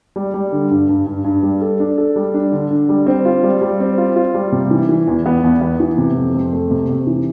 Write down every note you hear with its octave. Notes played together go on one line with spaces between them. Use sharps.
G3
G3
D3
G2
G2
G2
G2
G3
A4
D4
A4
G3
D4
D3
D3
G3
C4
F4
G3
G3
C4
F4
F4
G3
C3
E3
E3
E2
B3
E2
B3
E3
C3
F2
F2
A3
C3
C3
E3